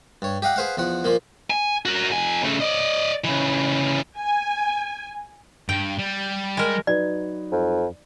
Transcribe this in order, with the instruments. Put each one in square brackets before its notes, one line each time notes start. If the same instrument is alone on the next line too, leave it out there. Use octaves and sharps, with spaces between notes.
[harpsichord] G2 C#5
G4 D#5 F5 F#5
G#4 B4 C5 F5 F#5
E2 F3 F#5
A#2 F3 A#3
[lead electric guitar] G#5
F#4 A#4
F2 G#5
C#3 A3
D5 D#5
C#3 E3
[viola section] G#5
[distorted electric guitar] G2 [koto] G5
[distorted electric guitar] G3
[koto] G#3 A#4
[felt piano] F#3 D#4 B4 [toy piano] D5
[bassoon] F2